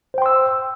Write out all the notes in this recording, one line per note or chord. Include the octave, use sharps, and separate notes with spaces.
C5 G5 C6 E6